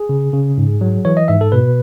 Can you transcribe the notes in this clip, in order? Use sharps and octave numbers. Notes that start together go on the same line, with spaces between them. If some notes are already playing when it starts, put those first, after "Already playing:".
Already playing: G#4
C#3
C#3
G#2
F#3
E3 C#5
D#5
G#2 E5
A4
B2 B4